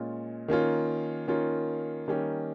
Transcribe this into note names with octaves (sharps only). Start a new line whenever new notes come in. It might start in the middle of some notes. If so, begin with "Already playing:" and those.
Already playing: A#2 G#3 C#4 F4
D#3 A#3 C#4 F4
D#3 A#3 C#4 F4
D#3 G3 A#3 C#4 G4